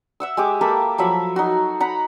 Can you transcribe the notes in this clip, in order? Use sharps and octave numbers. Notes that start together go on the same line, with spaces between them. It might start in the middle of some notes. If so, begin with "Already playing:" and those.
E5 F#5 E6
G#3 G4 D6
A#3 G4 A4 B5
F3 F#3 E5 B5
D#4 F#4
F#5 A#5 B5